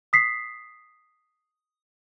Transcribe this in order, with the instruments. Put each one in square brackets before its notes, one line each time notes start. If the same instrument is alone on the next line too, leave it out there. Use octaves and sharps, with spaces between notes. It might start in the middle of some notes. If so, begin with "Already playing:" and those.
[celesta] D#6 B6 C7